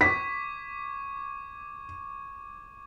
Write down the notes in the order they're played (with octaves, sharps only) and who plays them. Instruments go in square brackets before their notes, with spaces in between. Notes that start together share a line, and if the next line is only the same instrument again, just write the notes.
[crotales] C#6 D6 G#6 [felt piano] B6